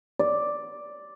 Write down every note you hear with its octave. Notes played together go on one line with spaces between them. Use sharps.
D5